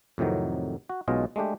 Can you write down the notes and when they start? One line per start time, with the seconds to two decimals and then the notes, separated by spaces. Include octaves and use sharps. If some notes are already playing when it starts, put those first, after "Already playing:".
0.18 F2 A2 C3 D#3 F#3
0.89 F#4
1.08 B1 B2 G#3 C#4 F4 D#5
1.36 G#3 A3 D4 G4